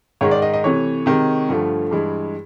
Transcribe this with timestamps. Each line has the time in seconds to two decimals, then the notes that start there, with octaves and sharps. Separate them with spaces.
0.21 G#2 D#3 G#3 C#5
0.31 D5
0.42 D#5
0.54 D#5
0.64 C3 E3 A3 C#5
1.06 C3 D#3 G#3
1.49 G2 D3 F3 A3
1.91 G2 E3 G#3